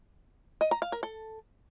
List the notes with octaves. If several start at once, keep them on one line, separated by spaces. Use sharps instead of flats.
D#5
A#5
F5
A#4
A4